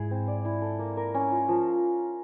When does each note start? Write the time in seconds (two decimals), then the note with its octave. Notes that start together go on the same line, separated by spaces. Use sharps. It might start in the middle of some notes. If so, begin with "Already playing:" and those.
Already playing: G#2 E4 G#4
0.11 C4
0.27 D5
0.45 E4
0.62 A4
0.79 A#3
0.97 A#4
1.14 C#4
1.31 F4
1.49 F3